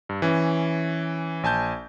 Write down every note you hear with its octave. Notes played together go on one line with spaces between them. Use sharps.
G2
E3 C#4
A#1 G#5 A5 G6